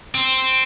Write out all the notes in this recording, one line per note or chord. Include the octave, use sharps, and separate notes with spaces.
C4